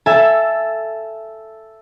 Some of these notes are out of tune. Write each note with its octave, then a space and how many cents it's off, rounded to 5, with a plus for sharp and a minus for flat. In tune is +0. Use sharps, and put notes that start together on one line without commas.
A4 +0 E5 +15 G#5 +0